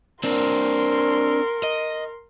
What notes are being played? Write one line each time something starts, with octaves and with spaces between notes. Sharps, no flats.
C4 D4 A#4 C6
D#5